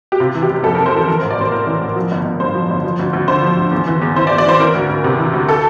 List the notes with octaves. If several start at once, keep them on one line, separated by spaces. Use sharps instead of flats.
G4
C3 F4
E3
G4
F1
F2 A4
C3 A#4
C5
E3 A4
E3 A#4
A1 C5
D5
A1 C5
A2 A#4
E3
A1
F3
G1
G1
G2 C5
F3
G1
F3
D2
D2
D3 C5
F3
D2
E2
E3
E2
E3 C5
D5
E2
D5
E3 C5
E3 A#4
D2
D2
C3
E3
D2
A4